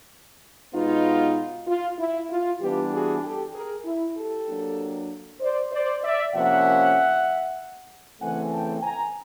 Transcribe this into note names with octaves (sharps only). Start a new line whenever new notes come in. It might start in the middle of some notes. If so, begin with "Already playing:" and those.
B2 G#3 B3 D#4 F4
F4
E4
F4
E3 G3 B3 D4 F4 G4
F#4 G#4
G4 A4
G#4 A#4
E4
G4 A4
F#3 A#3 D4
C5 D5
C5 D5
D5 E5
C3 F3 A#3 C#4 E5 F#5
C#3 E3 A3 C4 F#5 G#5
G5 A5
G#5 A#5